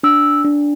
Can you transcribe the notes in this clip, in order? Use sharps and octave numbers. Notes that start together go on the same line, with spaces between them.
D4 E6
D4